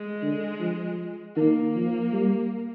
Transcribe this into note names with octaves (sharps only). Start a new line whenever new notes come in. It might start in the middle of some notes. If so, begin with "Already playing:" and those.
Already playing: G#3
D3
F3
D#3 A#3
F3
G3